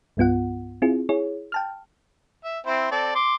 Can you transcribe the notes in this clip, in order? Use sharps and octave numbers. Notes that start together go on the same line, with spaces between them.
C2 G2 B3 F4 F#5
C4 E4 F4 G#4
E4 G#4 C#5
G5 A5 F6
E5
C4 E4 C5
C4 A4 D5
C6 D6